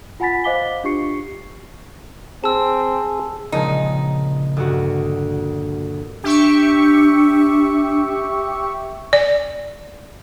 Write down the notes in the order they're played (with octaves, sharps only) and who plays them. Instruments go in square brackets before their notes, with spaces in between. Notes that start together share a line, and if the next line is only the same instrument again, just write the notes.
[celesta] F4 F#5 G#5 B5 A6 B6
C5 D#5 F5 D6 B6 G7
D4 F4 G4 C#6 C7 C#7
[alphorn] C4 [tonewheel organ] G#4 [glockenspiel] A5 E6
[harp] A#1 C#3 G#3 [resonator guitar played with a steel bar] D#4
[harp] D2 G2 F#4
[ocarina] D4 [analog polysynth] G4 E5 C#6
[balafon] D5